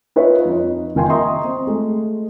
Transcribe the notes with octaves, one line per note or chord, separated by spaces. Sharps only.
D#4 F4 B4 C#5 E5
F2 D#4
F#1 D#3 F5 G5 G#5 C6
D#5 E5 A#5 C6 C#6 D#6
C4
G#3 A3 G#4